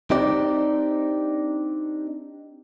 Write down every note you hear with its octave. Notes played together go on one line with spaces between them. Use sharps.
C4 D4 D#4 G4 D5